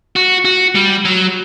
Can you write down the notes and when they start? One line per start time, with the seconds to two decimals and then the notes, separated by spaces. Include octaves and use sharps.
0.16 F#4
0.45 F#4
0.75 G3
1.05 F#3